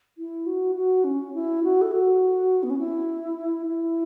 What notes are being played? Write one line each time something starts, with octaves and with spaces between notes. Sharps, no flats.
E4
F#4
F#4
C#4
E4
F#4
A4
F#4
B3
C#4
E4
E4